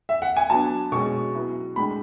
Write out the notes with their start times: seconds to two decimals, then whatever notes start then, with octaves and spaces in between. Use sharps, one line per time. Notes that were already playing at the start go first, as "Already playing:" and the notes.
0.09 E5
0.22 F#5
0.37 G#5
0.50 F#3 B3 D4 A5
0.92 B2 G#3 C#4 C#6
1.35 F#3 B3 E4
1.76 A2 G#3 D4 B5